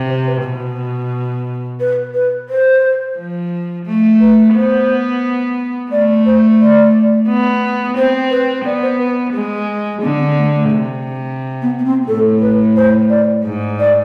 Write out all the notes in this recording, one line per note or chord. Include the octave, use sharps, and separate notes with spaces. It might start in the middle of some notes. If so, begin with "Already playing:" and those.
Already playing: C3
C5
B4
B2
B4
B4
C5
F3
A3
B4
B3 C5
A3 D5
C5
D5
B3
C4 C5
B4
B3 D5
C5
B4
G#3
D3 B3
C4
A3
A3
C3
B3
B3
C4
A2 A4
B4
C5
D5
G#2
D5